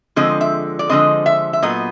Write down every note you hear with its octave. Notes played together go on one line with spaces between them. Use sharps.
D3 F3 G#3 C4 D#5
E5
D5
D3 F3 G#3 C4 D#5
E5
E5
A#2 F#3 B3 D#5